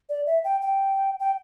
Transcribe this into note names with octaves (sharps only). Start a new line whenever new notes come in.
D5
E5
G5
G5
G5